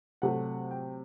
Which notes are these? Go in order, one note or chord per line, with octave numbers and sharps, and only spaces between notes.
C3 F#3 A3 F#5
G5